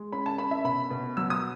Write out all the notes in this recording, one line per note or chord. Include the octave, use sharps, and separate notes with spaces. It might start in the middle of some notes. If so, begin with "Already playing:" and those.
Already playing: G#3
C#4 B5
A5
C#4 B5
E5
B2 B5
B2
F#3 E6
D#6